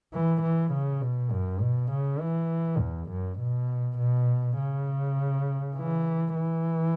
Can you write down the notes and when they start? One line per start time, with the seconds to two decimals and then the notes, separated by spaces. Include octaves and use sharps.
0.13 E3
0.42 E3
0.72 C#3
1.01 B2
1.31 F#2
1.61 B2
1.91 C#3
2.20 E3
2.79 E2
3.09 F#2
3.39 B2
3.98 B2
4.58 C#3
5.76 E3
6.36 E3